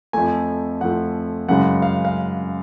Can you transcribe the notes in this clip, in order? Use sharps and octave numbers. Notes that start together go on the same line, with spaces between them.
F2 F3 A3 G#5
F2 F3 A3 F#5
F#2 C#3 G#3 F#5
F5
F5